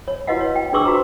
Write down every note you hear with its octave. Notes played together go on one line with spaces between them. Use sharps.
C#5
E4 F#4 B4 D#5 F5 F#5
C#5
G5
D4 G#4 B4 C#6 D6 E6
F#4 C5 A#5